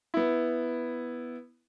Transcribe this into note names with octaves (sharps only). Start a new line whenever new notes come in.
B3 E4